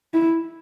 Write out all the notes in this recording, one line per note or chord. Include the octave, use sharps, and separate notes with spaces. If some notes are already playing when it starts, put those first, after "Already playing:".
E4